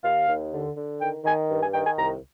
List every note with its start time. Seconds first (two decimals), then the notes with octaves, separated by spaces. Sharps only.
0.03 D#2 F5
0.28 D#2
0.52 D3
0.76 D3
1.00 D#3 G5
1.24 D#3 G#5
1.49 G2
1.62 G#5
1.73 D#3 G5
1.85 G#5
1.98 C2 A#5